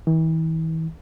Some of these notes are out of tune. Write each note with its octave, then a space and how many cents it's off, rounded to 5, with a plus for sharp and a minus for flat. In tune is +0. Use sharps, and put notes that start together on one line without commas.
E3 -40